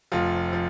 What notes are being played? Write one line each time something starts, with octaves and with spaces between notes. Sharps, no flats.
F1 F3 F4
F3